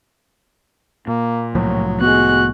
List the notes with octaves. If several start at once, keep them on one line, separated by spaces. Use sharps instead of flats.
A#2 A#3
C2 A2 F3 F#3
G#3 B3 F#4 F#6